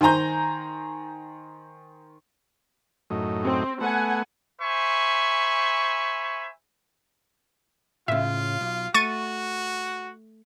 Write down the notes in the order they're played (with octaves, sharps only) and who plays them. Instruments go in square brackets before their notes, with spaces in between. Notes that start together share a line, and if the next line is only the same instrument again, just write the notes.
[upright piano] D#3 C5 G#5 A#5 G6
[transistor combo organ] F#2 A2 D#4
[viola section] C4
[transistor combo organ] A3 B3 [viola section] F#5 G#5
[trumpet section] C5 E5 G#5 B5 C#6
[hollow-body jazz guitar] A2 C#3 [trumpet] F4 [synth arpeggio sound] E5
[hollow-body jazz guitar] B1
[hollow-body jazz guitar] A3 [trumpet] F#4 [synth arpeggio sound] C#6 A6 D#7